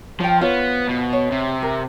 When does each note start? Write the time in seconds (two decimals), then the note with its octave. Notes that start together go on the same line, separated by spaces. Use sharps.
0.20 F3 C#5 G5
0.41 B3 F4 C5 C#5
0.89 B2
1.13 C#5
1.31 C3
1.62 A#4